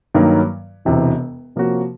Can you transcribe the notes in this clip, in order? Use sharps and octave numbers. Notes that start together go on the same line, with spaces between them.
G2 D#3 F#3 A#3 C#4
E1 E2 C3 E3
C3 F3 A#3 C#4 F#4